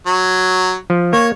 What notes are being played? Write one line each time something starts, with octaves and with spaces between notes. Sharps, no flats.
F#3
F3
A#3 C#5